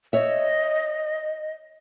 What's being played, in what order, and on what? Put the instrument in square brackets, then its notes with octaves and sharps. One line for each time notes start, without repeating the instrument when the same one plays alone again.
[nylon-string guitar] C#5 E5 [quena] D#5